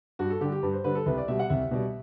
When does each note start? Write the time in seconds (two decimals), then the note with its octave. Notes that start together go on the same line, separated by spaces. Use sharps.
0.19 G2 F#4
0.30 A4
0.41 D3 G4
0.44 G3
0.52 G4
0.63 G2 B4
0.73 C5
0.84 D3 G3 B4
0.95 A4
1.06 C2 B4
1.18 D5
1.28 B2 G3 E5
1.39 F#5
1.50 C2 E5
1.71 B2 G3